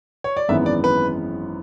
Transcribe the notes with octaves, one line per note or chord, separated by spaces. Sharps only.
C#5
D5
G#1 F#2 E3 G#3 B3 E5
D5
B4